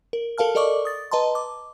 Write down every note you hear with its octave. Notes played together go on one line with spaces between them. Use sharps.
A#4
A4 A#4 F5 A5 F6
A4 A#4 D5 D#5 C#6 D6
D#6 A6
B4 D#5 A5 A#5 C6
D6